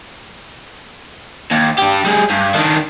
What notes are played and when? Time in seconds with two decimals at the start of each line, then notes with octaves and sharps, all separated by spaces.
1.51 D#2
1.78 D4 G4
2.05 G3 G#4
2.30 G2
2.54 D#3 D4